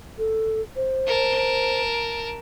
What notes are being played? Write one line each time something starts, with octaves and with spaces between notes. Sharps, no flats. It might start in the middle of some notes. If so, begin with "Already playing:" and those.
A4
C5
A#4 A5